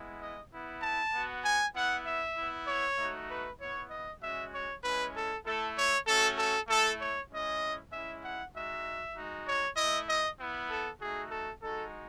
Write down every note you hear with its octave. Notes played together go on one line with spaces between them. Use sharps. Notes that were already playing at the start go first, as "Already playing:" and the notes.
Already playing: G#3 B3 E4
D#5
B3 E4
A5
B3 F#4
G#5
B3 E4 F#5
E5
B3 E4
C#5
A3 D#4 F#4
B4
B3 E4 C#5
D#5
G#3 C#4 F#4 E5
C#5
G#3 C#4 E4 B4
A4
A3 E4 A4
C#5
A3 C#4 F#4 A4
A4
A3 E4 A4
C#5
G#3 C#4 E4 D#5
G#3 C#4 E4 E5
F#5
G#3 D#4 F#4 E5
G#3 D#4 F#4
C#5
A3 E4 D#5
D#5
B3 E4
A4
A3 D#4 F#4 G#4
A4
G#3 D#4 F#4 A4